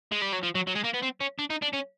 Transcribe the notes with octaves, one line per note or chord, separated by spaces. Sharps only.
G#3
G3
F#3
F3
F#3
F#3
G#3
A#3
B3
C4
C#4
D4
D#4
D4
C#4